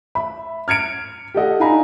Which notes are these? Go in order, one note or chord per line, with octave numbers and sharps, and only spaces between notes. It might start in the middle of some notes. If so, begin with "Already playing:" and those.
E5 B5
F6 G#6 C#7 D7
G4 A4 D#5 F#5
D4 D#4 F5 G#5 A#5 B5